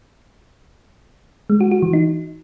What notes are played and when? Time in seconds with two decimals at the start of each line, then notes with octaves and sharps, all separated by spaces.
1.50 G#3
1.61 F#4
1.71 F#4
1.82 E3
1.93 D#4